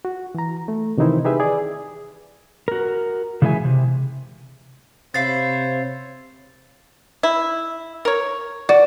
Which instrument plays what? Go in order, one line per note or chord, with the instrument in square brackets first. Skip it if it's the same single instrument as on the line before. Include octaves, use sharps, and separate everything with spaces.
[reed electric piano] F#4
E3 A#5
A3
C3 D#3 E3 D#4 E4 C5
D#4 G4 G#4 B4 E5
G#4 D5
[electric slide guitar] F#4 A#4
C#3 E3 G#3 A4 E5 G#5
C3
[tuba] C3 [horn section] C5 C#5 [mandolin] E5 F5 B5 [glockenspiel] A6 C7
[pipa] E4
A#4 C#5
[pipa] F#4 [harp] D5